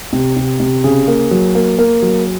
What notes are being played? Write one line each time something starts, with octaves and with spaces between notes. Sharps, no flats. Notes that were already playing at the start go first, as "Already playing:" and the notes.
C3
C3
C3
C#3 G#4
A#3
F#3
A#3
A#3
F#3